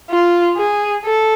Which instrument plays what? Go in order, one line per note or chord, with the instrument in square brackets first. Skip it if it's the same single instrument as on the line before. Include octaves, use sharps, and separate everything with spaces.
[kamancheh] F4
G#4
A4